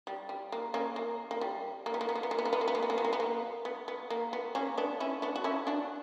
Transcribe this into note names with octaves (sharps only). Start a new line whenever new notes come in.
G3
G3
A#3
A#3 C#4
A#3
A#3
G3
A#3
B3
A#3
B3
A#3
B3
A#3
B3
A#3
B3
A#3
B3
A#3
B3
A#3
B3
A#3
B3
A#3
B3
B3
A#3
B3
A#3 C#4
B3 D4
C#4 E4
B3 D4
F#4
C#4 E4
D4 F#4